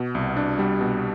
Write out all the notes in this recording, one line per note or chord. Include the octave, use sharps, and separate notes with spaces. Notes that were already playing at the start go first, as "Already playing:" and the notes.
Already playing: B2
C2
D4
G3
B2